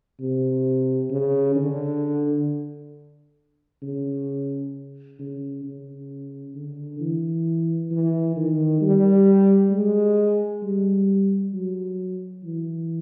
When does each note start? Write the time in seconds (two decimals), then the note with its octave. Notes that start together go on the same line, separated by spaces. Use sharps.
0.20 C3
1.11 C#3
1.56 D3
3.83 C#3
5.19 C#3
5.64 C#3
6.55 D3
7.00 E3
7.92 E3
8.36 D#3
8.81 G3
9.72 G#3
10.63 G3
11.54 F#3
12.44 E3